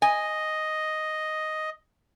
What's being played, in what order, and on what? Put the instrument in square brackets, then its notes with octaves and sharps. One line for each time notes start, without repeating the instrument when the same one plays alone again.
[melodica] D#5 [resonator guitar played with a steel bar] G#5